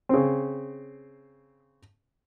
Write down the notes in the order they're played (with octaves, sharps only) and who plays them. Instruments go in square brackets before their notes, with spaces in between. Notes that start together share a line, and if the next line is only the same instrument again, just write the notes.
[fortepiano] C#3 C4